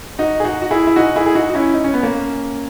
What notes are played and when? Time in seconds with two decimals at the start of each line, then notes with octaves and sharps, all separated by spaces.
0.19 D#4 F#4
0.40 G#4
0.44 D#4 F#4
0.62 F#4
0.71 E4 G#4
0.87 E4
0.96 D#4 F#4
1.16 E4 G#4
1.26 G#4
1.35 D#4 F#4
1.50 F#4
1.55 C#4 E4
1.74 D#4
1.84 C#4
1.93 B3
2.03 A#3 C#4